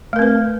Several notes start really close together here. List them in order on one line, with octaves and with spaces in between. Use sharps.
A3 A#4 C4 B4